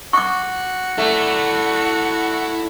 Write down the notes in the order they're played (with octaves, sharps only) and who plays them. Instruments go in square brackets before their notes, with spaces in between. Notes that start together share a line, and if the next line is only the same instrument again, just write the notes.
[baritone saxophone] F#4 [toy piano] C#6 D6
[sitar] A3 [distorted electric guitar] E4 D5